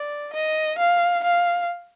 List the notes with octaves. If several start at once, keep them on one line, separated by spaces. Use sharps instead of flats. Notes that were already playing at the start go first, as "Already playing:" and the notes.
Already playing: D5
D#5
F5
F5